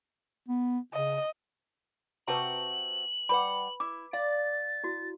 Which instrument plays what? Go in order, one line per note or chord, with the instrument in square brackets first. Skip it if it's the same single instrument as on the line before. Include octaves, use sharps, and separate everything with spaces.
[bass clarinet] B3
[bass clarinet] C#3 [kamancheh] D#5
[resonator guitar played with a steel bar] C3 C4 F#4 [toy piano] B4 A5 A#5 [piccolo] F#7
[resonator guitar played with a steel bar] G3 F#5 [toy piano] B4 B5
[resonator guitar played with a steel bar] E4 [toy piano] D6
[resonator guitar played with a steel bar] D5 [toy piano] F5 [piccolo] A6
[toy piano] E4 F#4